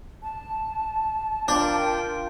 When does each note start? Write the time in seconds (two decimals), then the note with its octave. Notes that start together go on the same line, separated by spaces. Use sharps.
0.23 A5
1.48 D4 F4 A#4 G5